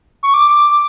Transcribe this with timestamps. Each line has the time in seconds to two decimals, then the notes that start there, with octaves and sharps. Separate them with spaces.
0.23 C#6
0.34 D6